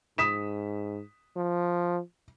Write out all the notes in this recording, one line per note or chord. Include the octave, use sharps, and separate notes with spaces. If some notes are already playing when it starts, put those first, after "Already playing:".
G#2 D#6 B6 E7
F3